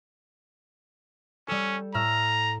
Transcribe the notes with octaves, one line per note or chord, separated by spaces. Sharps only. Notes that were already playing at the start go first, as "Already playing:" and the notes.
G3 C#4 A4
A2 A#5 E6 F6